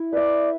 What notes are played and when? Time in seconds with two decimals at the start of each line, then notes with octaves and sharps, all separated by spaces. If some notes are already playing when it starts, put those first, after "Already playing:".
Already playing: E4
0.13 B4 D5 E5